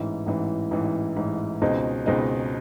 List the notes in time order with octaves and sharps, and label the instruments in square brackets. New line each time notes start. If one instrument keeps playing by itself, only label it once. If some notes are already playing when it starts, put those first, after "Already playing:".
Already playing: [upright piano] A1 G#2 E3
A1 G#2 E3
A1 G#2 E3
A1 G#2 E3
C#2 B2 G#3 C4 D#4
C#2 B2 G#3 C4 D#4